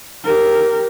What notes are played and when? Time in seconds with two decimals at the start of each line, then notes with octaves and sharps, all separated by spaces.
0.24 G4 A#4